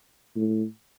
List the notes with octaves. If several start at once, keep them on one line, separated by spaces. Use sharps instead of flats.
A2